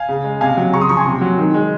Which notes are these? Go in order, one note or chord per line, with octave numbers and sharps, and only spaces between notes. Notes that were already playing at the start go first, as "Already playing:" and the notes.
Already playing: F5 G#5
C#3
G#3
C3 F5 G#5
F#3
C#3 A#5 C#6
C6 D#6
F3 A#5 C#6
G#5 C6
C3
F#3
D#3
G#3